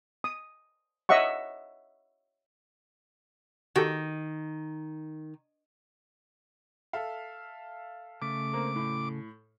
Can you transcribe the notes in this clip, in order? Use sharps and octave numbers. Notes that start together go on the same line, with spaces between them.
D#6
C#5 D#5 E5 F#5 C#6
D#3 F#4 G4 A4
A4 E5 F5
C#3 A3 D6
A#3 C4 A#4
A2